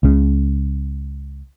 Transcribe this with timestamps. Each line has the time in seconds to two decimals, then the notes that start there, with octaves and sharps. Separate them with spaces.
0.03 C#2 C#3